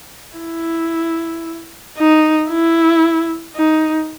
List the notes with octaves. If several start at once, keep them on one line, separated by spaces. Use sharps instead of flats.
E4
D#4
E4
D#4